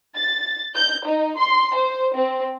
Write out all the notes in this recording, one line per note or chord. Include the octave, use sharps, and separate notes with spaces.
A6
G6
D#4
C6
C5
C4